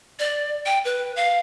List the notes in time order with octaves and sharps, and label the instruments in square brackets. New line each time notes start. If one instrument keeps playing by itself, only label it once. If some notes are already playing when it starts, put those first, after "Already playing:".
[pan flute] D5
G5
B4
F5